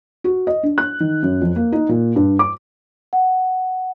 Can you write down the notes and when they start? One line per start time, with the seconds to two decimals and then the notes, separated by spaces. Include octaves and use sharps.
0.24 F#4
0.47 D#5
0.63 D4
0.78 F#6
1.00 D#3
1.23 F#2
1.41 F2
1.56 A#3
1.72 D#4
1.89 A#2
2.16 G2
2.39 D6
3.13 F#5